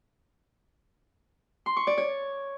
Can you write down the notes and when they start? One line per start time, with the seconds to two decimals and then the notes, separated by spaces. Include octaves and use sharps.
1.66 C6
1.77 C#6
1.87 D5
1.98 C#5